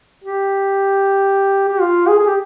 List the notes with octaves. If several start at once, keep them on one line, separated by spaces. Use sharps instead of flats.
G4
G4
F4
G#4
G#4
G4